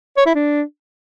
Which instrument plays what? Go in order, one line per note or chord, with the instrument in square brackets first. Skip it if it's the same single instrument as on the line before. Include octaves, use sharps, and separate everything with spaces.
[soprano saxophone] C#5
E4
D4